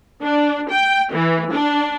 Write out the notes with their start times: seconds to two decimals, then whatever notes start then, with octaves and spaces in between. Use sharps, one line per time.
0.22 D4
0.70 G5
1.12 E3
1.52 D4